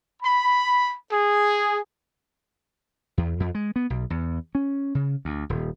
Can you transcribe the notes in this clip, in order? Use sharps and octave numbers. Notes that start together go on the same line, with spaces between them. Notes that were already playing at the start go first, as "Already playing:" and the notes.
B5
G#4
E2
F2
G#3
B3
B1
E2
C#4
C#3
D2
D#1